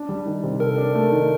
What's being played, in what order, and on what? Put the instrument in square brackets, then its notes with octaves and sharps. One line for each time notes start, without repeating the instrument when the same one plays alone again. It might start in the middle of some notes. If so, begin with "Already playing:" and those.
Already playing: [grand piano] D4
G3
D#3
C3
[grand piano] A4 [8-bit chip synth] A#4
[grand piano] D4
A3
D#3